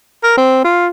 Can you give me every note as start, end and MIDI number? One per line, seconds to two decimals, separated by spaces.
0.24 0.36 70
0.37 0.63 60
0.64 0.87 65